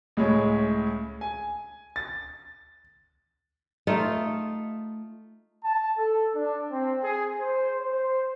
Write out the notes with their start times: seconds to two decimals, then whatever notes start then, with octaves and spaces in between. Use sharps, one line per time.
0.17 C#2 A2 G#3 C#5
1.21 G#5
1.96 A6
3.87 A3 D#4 F4
5.65 A5
5.98 A4
6.35 D4
6.71 C4
7.04 G#4
7.40 C5
7.81 C5